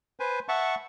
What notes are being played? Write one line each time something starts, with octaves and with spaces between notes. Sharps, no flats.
B4 C5 G#5
E5 F#5 A5 C#6